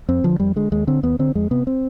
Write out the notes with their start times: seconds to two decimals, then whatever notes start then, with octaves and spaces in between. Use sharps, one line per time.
0.09 F2 C4
0.24 D3 F3
0.40 F2 G3
0.56 D3 G#3
0.72 D#2 G#3
0.87 D3 C4
1.03 D#2 B3
1.19 D3 C4
1.35 F2 G#3
1.51 C3 B3
1.67 C4